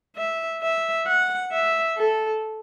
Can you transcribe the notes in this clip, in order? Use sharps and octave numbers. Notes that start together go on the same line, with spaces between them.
E5
E5
F#5
E5
A4